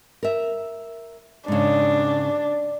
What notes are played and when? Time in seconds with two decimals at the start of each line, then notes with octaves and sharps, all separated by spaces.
0.23 A#4 E5
1.48 G#2 C#3 D4